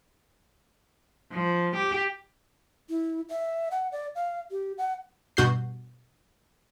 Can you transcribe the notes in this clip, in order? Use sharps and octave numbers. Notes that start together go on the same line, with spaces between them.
F3
G4
E4
E5
F#5
D5
F5
G4
F#5
G2 B2 F#4 G6 C7